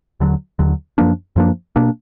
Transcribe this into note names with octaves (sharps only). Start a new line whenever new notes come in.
D#2 D3 F#3
D#2 D3 F#3
F#2 F3 A#3 D4
F#2 F3 A#3 D4
B2 A#3 D4